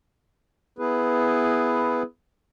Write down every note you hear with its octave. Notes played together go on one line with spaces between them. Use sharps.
B3 E4 G#4 B4